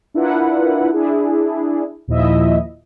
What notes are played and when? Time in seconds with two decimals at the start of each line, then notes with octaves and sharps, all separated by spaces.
0.14 D4 E4 F4 A#4 B4 F#5
0.93 D4 E4 G#4
2.08 D#2 A#2 F3 E4 D#5 E5